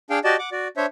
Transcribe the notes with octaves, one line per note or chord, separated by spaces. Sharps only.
D4 G#4 F5 G5
F#4 G4 D5 D#5 A5
F#5 D6
F#4 D5
D4 C5 C#5 E5